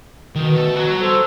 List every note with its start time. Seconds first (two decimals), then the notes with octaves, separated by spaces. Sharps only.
0.35 B2 D#3
0.56 A3
0.76 F#4 A#5
1.01 A4 C5